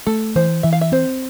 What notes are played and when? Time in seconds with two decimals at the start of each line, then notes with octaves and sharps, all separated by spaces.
0.06 A3 A4
0.36 E3 C5
0.63 E3 E5
0.73 F5
0.81 E5
0.92 C4 C5